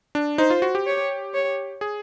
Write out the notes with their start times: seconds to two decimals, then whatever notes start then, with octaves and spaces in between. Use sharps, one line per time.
0.15 D4
0.38 D#4 C5
0.50 F4
0.62 F#4
0.75 G4
0.87 C#5
1.34 C#5
1.81 G#4